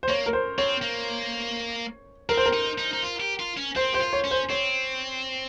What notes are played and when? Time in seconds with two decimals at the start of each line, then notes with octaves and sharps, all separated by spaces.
0.03 C5
0.08 A#3 C#5
0.26 A#4
0.33 C5
0.58 C4 C#5
0.82 A#3
2.29 C4 A#4
2.37 C5
2.46 A#4
2.53 D#4
2.78 D#4
2.93 D#4
3.02 F4
3.20 G4
3.40 F4
3.57 C#4
3.76 C4 C5
3.93 G4 C5
4.01 F4
4.13 C#5
4.24 C#4
4.31 C5
4.50 C4 C#5